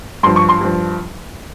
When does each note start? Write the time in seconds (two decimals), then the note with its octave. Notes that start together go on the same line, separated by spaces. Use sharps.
0.23 G2 C6
0.26 F3
0.36 C#6
0.49 C6
0.61 G2 F3